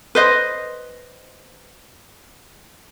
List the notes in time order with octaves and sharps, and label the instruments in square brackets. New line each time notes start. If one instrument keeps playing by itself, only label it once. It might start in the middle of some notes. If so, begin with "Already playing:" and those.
[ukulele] B4 C5 D#5